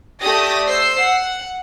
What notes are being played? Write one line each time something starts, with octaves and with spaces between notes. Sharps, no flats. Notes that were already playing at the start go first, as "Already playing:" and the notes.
A3 G4 D5 D#6 A#6
C5 E6 C7
F#5